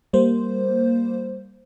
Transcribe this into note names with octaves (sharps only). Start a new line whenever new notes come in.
G3 A#3 C5